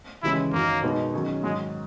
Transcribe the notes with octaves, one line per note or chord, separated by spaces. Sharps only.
D#2 C#3 E3 G#3 E4
F#2 D#3 F#3 A#3
B2 G#3 B3 D#4 A#4
D#3 F#3 C#4 G#4
G#2 D#3 F#3 G#3